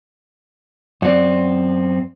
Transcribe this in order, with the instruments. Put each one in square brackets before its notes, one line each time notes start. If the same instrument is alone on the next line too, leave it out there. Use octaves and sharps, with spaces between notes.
[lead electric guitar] F#2 C4 [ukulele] D5 F#5